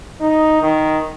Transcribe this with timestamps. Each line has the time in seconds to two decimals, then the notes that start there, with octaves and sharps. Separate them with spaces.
0.20 D#4
0.61 D#3